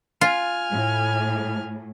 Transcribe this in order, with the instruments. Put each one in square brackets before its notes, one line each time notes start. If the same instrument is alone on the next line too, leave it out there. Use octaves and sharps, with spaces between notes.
[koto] F4 [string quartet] G#5 F6
[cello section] A2